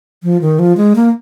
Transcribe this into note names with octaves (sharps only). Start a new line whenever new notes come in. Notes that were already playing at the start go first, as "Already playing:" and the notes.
F3
D#3
F3
G#3
A#3